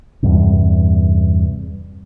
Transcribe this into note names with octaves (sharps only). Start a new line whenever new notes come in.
E2 G2 C3